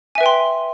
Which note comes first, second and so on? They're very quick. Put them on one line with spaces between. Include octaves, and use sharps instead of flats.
G#5 E5 B4 G5 C6